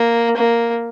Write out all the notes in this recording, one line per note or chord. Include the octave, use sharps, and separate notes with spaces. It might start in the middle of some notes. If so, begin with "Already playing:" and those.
Already playing: A#3
A#3